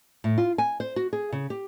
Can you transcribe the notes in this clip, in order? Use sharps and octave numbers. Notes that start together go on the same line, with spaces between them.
A2
F4
G#5
C5
F#4
G#4
C#3
G4